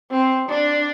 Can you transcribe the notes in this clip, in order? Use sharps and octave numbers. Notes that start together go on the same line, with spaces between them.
C4
D4